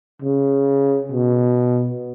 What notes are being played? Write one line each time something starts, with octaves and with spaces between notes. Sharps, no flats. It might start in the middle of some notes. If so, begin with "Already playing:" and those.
C#3
B2